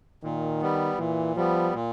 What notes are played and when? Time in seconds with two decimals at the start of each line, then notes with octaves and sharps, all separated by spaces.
0.23 A#2 D#3
0.61 G3 B3
0.99 A#2 E3
1.36 F3 G3 B3
1.74 A#2